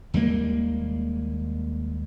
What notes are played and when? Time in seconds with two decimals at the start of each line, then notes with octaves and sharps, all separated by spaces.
0.14 D#2 G3 G#3 A#3